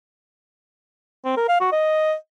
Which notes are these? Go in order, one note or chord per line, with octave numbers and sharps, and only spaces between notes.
C4
A#4
F5
F#4
D#5